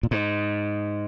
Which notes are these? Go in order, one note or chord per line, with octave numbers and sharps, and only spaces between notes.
A#2
G#2